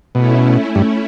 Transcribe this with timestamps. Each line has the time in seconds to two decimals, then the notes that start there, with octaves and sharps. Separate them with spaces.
0.15 B2 A3 C#4 E4
0.75 G2